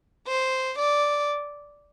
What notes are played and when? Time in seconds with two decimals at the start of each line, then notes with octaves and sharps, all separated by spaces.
0.28 C5
0.78 D5